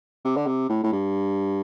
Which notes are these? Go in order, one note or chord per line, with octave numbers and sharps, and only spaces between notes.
C3
D3
C3
A2
A2
G2